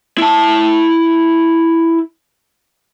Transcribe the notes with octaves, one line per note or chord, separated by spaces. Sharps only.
E4 A5